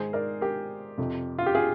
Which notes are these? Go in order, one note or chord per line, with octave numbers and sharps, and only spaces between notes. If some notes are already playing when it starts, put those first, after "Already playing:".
Already playing: G#2 D#3 G#4 C5
A#4 D5
G4 A#4
F2 C3 F3
F4
G4
F4 G#4